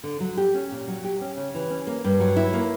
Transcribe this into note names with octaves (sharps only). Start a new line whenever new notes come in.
D3
F#3
G4
C#4
A#2
F#3
G4
C#4
C#3
E3
C#4
A#3
G2
F#3
E4
A#3